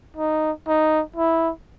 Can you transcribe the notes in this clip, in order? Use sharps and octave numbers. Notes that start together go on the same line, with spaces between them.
D#4
D#4
E4